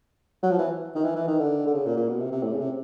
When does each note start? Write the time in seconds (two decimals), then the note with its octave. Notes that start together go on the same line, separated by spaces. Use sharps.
0.43 F#3
0.51 F3
0.59 E3
0.95 D#3
1.04 E3
1.16 E3
1.28 D#3
1.39 D3
1.67 D3
1.74 C#3
1.86 A#2
1.97 A#2
2.09 B2
2.20 C3
2.32 C3
2.43 A2
2.53 C#3
2.61 C3